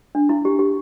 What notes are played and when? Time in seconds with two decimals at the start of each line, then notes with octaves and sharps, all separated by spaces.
0.15 D4
0.29 E4
0.45 G4
0.59 G4